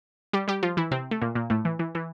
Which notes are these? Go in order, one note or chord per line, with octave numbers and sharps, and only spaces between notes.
G3 G4
G3 G4
F3 F4
E3 E4
C3 C4
A3
A#2 A#3
A#2 A#3
A2 A3
E3
E3
E3